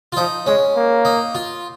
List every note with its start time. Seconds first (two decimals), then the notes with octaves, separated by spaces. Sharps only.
0.12 F4
0.16 F3 D#4
0.47 G#3 C#4
0.75 A#3
1.05 D#4
1.35 F4